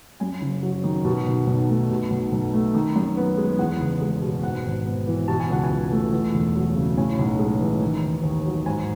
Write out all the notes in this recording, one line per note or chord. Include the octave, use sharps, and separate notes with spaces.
F#2 G#5
F#1
F#3
D#3
B2
B1
B1
A3
B2
B1
B1
A3
D#3
F#2
B3
G#3
E2 F#5
F#1
G#3
B2
G#2 F#5
G#1
B3
E3
B2 A5
G#5
C#2 F#5
G#5
C#2
A3
E2
E1
F#3
C#3
A2 G#5
B1
G#3
E3
D#3
D#2
D#2
F#3
G#2 G#5